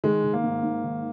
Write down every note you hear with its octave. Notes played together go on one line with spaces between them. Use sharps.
D#3 G#3
D#3
A#3
G#2
G#2
D#3